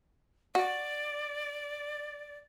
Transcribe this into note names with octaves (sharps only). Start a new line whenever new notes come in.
F#4 D5